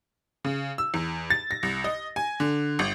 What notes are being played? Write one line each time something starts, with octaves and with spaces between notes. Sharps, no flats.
C#3
E6
E2
A6
A#6
C2
D#5
G#5
D3
G1